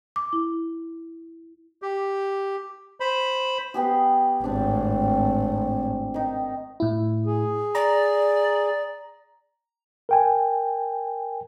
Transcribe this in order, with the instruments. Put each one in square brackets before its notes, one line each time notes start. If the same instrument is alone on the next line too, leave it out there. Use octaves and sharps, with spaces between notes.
[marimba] D6
E4
[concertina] G4
C5 B5
[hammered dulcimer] B3 G4 G#4
[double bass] G#1 A2 [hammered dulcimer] C4 D4
[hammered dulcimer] D#3 D#4
[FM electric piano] A2 E4
[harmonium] G#4
[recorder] D5 [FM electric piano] A#5
[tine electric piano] A#4 G5 G#5